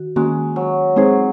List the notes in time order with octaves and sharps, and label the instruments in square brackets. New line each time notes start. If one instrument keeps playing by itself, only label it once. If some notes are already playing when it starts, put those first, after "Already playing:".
Already playing: [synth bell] D#3 F#4
[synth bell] D#3 A#3 C#4 F#4 [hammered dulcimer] G#3
[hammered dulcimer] F#3
[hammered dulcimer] F#3 [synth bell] G#3 C4 D#4 G#4 C5